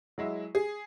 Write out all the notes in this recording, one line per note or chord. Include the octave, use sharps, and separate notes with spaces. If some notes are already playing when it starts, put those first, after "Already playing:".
F#3 G#3 E4
G#4